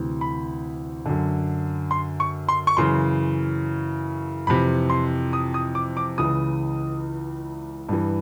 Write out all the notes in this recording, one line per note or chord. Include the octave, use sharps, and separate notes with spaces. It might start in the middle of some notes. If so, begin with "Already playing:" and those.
Already playing: D2 C3 E3
B5
F#2 D3
C6
C#6
C6
C#6
F#2 C#3 E3 C6
F2 C3 E3 B5
C6
D#6
D#6
D6
D6
C#2 C#3 E3 D#6
G2 E3